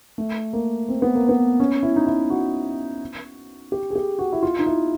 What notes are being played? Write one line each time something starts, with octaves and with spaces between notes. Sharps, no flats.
A3
A#3
C4
B3
A#3
B3
C#4
E4
D#4
E4
F#4
G4
G#4
G4
F#4
E4
F4
D#4
E4